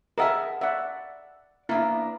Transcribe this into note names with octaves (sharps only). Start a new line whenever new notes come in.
G#4 A#4 D#5 E5 F#5 A5
D5 E5 F#5
A#3 B3 D4 E4